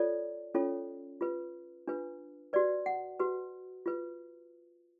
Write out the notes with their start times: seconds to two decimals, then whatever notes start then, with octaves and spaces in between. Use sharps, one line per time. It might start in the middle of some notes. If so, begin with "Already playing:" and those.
Already playing: F4 A4 C#5 D5
0.55 C#4 F4 A4 C#5
1.21 F4 B4
1.87 D4 F4 B4
2.53 F#4 B4 D5
2.86 F#5
3.20 F#4 B4
3.86 F4 B4